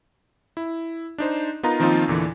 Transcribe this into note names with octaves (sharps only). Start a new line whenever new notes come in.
E4
D4 D#4 C5
B3 D#4 F4 A#4 A#5
D#3 F3 A#3 C4 D#4 F4
E2 A#2 D3 E3